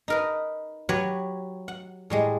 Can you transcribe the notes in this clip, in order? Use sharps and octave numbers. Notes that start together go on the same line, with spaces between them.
D#4 A#4 B4
F#3 G4 B4 C#5
F#5
A2 G3 G#3